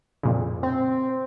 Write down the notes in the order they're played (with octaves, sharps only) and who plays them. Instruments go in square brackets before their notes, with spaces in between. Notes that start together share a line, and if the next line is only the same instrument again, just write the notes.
[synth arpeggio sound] F2 A#2 C#3
[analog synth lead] C4